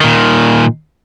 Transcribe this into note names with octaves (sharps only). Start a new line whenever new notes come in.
A#2 D#3